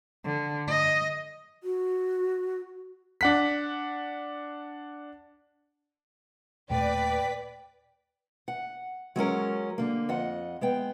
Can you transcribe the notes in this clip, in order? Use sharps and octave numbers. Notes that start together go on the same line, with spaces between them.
D3
D#5
F#4
D4 F#5 B6
D#2 A#2 A3 B4 D5 G5 B6
F#5
F#3 G#3 C#4 A#4
D3 A#3
F2 D#5 F#5
G#3 B3 G5